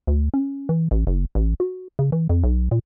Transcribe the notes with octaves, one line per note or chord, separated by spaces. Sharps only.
D2
C#4
E3
A1
F#1
A1
F#4
C#3
E3
F2
B1
A#2